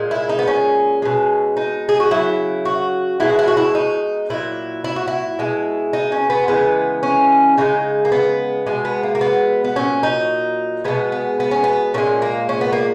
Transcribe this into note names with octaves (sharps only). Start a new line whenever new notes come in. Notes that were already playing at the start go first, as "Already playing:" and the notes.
Already playing: A#2 G#3
E4
D#4
B3
C#4
B2 G#3
D#4
G#4
F#4
C#3 F#3 E4
F#4
B2 G#3 E4
F#4
E4
F#4
E4
D#4
A#2 F#3 E4
E4
F#4
E4
B2 G#3
D#4
C#4
B3
C#3 E3 G#3 B3
C#4
C#3 E3 G#3 D#4
A#3
B3
B2 G#3
B3
A#3
A#3
B3
B3
A#2 F#3 C#4
D#4
B2 G#3 B3
B3
B3
C#4
B3
A#2 G#3 C#4
A#3
C#4
B3
A#3